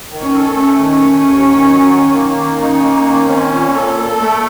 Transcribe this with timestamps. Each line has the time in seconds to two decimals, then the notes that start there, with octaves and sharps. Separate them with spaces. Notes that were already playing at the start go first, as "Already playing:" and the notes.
0.10 D#3
0.22 C#4
0.33 A4
0.55 A3 C#4
0.78 D#3
0.90 C#4
1.02 A3
1.24 D#2
1.46 D#3
1.69 F#3
1.92 D#3
2.15 A#3
2.37 D#3
2.60 C#4 D#4
2.82 A#3
3.06 D#3
3.28 C4 C#4
3.51 A#2
3.63 A#3
3.73 A4
3.96 A4
4.19 A3